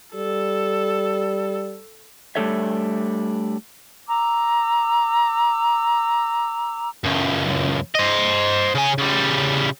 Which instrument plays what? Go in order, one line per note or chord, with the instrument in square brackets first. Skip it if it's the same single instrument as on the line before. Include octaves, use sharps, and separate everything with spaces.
[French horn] G3 [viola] A4
[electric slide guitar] G3 A3 D4 A4 C#5 E5
[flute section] A#5 D6 E6
[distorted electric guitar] C#2 F#2
C5 D#5
C#3 G#5
C#3 G3